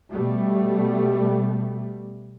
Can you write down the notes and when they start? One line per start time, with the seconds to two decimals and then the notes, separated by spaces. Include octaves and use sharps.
0.11 B2 G3 A3